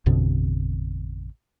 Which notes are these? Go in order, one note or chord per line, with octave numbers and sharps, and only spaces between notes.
A1 F2 B2 D3